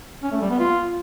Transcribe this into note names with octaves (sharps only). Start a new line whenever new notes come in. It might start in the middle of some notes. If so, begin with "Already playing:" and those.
C#4
A3
G3
B3
F4